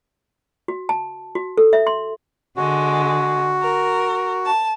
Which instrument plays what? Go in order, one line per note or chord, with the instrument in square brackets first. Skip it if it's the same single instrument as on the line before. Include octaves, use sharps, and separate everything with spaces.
[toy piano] F#4
A5
F#4
A4
E5
C6
[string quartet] D3 G#3 [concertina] F#4
[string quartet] A#4
A5